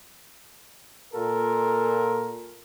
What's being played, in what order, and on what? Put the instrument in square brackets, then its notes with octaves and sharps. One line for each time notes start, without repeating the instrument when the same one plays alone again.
[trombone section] A#2 F4 A4 A#4